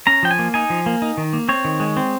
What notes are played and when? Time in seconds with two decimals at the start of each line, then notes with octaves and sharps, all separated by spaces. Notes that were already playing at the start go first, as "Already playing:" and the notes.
0.07 C#4 A#5
0.23 F3 G5
0.31 G#5
0.39 A#3
0.54 D#4 G#5
0.70 F3
0.86 A#3
1.02 D#4
1.18 D#3
1.33 A#3
1.49 C4 C#5
1.65 D#3
1.80 G#3
1.97 C4